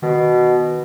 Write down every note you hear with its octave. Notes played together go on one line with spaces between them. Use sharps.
B2 D#3